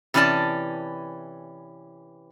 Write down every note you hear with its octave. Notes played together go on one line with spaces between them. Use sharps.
C3 E3 C#4 C#5 D5 A5